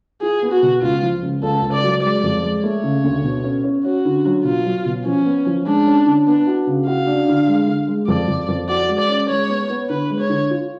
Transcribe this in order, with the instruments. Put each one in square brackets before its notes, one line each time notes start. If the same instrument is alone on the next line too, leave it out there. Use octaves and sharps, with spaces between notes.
[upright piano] F4 [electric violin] G#4
[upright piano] B3
[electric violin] F#4
[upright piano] B2
[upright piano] C#2 [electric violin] F4
[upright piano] F3
C#2
[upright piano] C#2 [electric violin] A4
[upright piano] C#2
[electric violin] D5
[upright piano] F#3
[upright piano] G#3 [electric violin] D5
[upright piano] F2
G#3
[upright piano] A3 [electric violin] C#5
[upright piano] C#3
D2
B2
C#4
C#4
[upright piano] C#4 [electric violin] F#4
[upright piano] D3
F#3
[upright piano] B2 [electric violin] F4
[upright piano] F#3
B2
[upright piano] F3 [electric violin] C#4
[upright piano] B3
F3
[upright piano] G#3 [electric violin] D4
[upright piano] C#4
D3
[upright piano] B3 [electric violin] D4
[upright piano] F#4
C#3
[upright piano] F#4 [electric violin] F5
[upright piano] D4
D3
G#3
D3
G#3
[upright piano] F2 [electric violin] D5
[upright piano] F2
F2
[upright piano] F#4 [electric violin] D5
[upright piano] G#3
[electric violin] D5
[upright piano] C#4
[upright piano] G#3 [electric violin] C#5
[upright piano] B3
B3
[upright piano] D3 [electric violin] B4
[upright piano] G#3
[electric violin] C#5
[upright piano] D3
F4